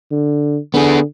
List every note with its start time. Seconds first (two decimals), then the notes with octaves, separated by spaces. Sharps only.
0.11 D3
0.74 D3 B3 G#4